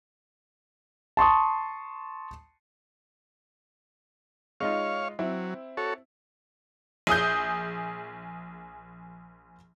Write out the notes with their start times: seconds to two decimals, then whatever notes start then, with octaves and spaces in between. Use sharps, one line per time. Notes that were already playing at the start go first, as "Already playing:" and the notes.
1.17 A5 C6 C#6 D#6
4.61 G#3 D#4 F4 C#5 F5
5.19 F#3 C4 E4
5.77 F#4 A4 C#5
7.07 A#1 G#4 D#6 G6